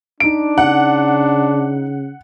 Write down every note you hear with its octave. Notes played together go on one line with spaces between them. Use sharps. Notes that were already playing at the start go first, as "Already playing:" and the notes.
D4 D#4 D7
C#3 F#5